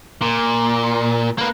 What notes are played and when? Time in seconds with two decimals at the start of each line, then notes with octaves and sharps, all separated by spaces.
0.22 A#2
1.38 A#3 B4